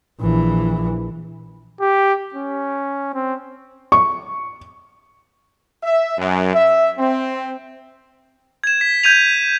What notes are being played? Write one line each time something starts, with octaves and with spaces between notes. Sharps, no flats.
A#1 E3
G4
C#4
C4
C#6
E5
F#2
E5
C4
G#6 E7
B6
G6 G#6 D#7 F7